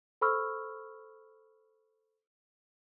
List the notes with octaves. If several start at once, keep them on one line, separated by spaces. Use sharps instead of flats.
A4 C5 B5 C#6 E6 F6